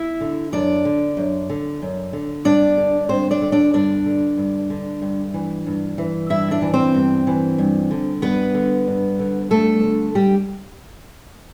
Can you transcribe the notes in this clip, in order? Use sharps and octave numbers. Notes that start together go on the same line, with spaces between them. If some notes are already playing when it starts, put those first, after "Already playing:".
Already playing: E4 E5
D3
F#2 D4 D5
D3
F#2
D3
F#2
D3
G2 D4 D5
D3
G2 C4 C5
D4 D5
D3
D4 D5
G2 D4 D5
D3
G2
D3
G2
E3
G2
E3
G2 E4 E5
D4 D5
E3
C4 C5
G2
E3
G2
D3
G2 B3 B4
D3
G2
D3
G2 A3 A4
D3
G3 G4